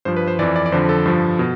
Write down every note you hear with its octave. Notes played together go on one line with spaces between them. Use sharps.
G2 F3 C5
B4
C5
F2 E3 D5
D5
D5
F2 D3 F3 C5
A4
G2 F3
B2